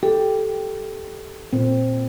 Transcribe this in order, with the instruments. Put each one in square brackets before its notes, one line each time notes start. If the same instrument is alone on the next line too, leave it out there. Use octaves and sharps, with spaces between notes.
[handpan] G4 [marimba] A4
[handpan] A#2 C4